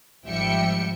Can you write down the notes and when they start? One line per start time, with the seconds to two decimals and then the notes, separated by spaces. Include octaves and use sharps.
0.25 G#1 F3 G3 E5 G5 C#7